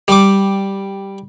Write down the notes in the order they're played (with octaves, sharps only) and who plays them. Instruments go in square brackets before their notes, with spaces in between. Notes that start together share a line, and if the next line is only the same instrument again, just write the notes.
[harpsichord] G3 D6